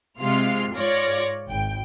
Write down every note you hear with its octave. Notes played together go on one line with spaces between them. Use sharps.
C3 G#3 F4 F6 C7
G#2 F4 C#5 D5 A#6
G#1 G5